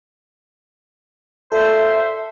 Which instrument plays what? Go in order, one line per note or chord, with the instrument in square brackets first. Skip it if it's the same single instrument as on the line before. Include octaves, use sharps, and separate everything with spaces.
[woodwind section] A#2 C5 [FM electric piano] A4 [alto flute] E5